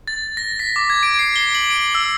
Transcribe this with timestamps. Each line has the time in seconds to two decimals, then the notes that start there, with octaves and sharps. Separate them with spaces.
0.08 A6
0.37 A#6
0.60 B6
0.76 D6
0.90 G#6
1.03 D7
1.19 C7
1.36 G7
1.55 F#7
1.70 D7
1.95 E6